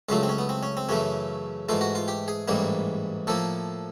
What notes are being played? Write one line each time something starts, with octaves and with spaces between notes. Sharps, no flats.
C#2 C#3 F#3 A3 F4
C4
C#4
B3
C4
C#4
C4
F#2 C#3 E3 A3 C#4
G#2 E3 A3 F4
F#4
F4
G4
G#4
A1 G#2 E3 G3 A#3
A2 F3 A#3 A4